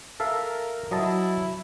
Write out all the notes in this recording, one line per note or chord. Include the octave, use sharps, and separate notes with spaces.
A4 A#4 E5 F5
F#3 E4 D#5 A5